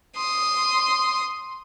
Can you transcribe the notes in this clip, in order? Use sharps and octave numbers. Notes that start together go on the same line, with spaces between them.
C6 D#6